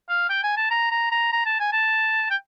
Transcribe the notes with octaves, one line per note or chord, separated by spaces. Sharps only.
F5
G5
G#5
A5
A#5
A#5
A#5
A#5
A5
G#5
A5
G5